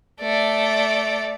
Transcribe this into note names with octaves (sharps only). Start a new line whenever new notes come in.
A3 D5